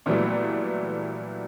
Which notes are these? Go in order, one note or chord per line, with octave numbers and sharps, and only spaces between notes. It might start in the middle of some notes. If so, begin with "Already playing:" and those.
A#2 E3 F#3 G3 A3 B3